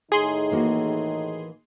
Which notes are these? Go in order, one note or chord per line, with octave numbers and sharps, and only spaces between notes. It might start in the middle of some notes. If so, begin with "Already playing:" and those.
A2 D#3 D#4 G#4 C6
E3 A#3 F#4